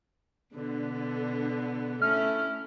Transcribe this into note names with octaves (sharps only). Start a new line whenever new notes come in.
B2 D3 B3
A3 C#4 E4 F6